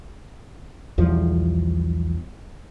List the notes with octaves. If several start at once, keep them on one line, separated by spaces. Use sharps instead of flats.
B1 E2 F3 G3